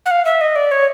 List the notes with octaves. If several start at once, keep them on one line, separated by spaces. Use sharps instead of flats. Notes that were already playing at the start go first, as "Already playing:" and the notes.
F#5
F5
E5
D#5
D5
C#5